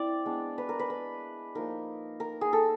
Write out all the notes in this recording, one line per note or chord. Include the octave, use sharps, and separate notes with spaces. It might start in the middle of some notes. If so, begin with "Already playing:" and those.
Already playing: C4 E4 D5
G#3 B3 D4
B4
A#4
B4
B4
F3 A#3 D#4 A#4
A#4
G#4
A4